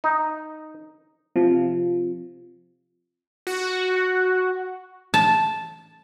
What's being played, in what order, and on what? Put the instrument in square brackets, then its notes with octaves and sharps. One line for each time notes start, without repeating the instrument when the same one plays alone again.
[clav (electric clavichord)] D#4
[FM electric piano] C3 F3
[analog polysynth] F#4
[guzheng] A5